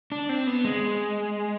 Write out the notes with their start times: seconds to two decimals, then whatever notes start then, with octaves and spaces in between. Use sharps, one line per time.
0.12 D4
0.29 C4
0.47 B3
0.64 G#3